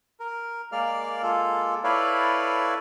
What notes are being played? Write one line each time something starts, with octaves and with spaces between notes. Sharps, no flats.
A#4
G#3 A#3 A#4 D5 F5 F6
G#3 A#3 F4 A4
E4 A4 B4 C#5 D5 F5